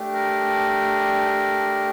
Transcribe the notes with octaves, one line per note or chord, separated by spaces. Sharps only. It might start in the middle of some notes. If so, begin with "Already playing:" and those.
Already playing: A3 D4 G4
A#4